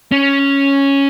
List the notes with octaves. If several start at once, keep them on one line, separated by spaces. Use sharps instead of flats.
C#4